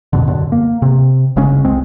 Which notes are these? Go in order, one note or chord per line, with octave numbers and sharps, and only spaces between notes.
F2 B2 D3
F#2 D3
A#3
C3
F#1 C#3 G#3 C#4
C2 G#3 C4